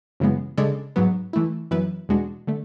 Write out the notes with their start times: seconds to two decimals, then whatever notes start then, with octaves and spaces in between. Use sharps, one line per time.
0.20 F#2 C#3 E3 G#3 B3
0.58 C#3 G#3 D4 A4
0.96 G#2 F#3 B3
1.33 E3 A3 E4
1.71 F#2 E3 B3 E4 B4
2.09 E2 B2 G#3 D4 F#4
2.47 D3 A3